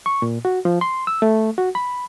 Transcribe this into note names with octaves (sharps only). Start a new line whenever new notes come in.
C#6
A#2
F#4
F3
C6
E6
A3
F#4
B5